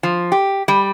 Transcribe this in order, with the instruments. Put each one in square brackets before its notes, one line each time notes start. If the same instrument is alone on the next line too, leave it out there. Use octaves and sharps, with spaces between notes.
[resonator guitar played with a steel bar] F3
G4
G3